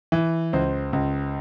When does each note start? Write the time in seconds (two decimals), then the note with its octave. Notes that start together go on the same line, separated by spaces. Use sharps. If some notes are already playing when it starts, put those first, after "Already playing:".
0.12 E3
0.53 C#2 C5
0.93 C#2